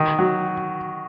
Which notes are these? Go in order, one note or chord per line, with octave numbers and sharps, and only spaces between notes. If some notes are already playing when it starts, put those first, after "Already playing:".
Already playing: D#3
F#3